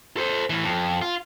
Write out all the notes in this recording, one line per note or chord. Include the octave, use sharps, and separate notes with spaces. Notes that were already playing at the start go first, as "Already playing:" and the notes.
A4 C5
A2 E3
F2
F4